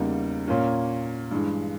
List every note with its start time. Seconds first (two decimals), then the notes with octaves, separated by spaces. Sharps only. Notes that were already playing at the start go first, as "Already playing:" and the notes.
Already playing: E2 C#3 G3 A#3 D#4
0.48 A#2 A#3 C#4
1.31 G2 E3 G#3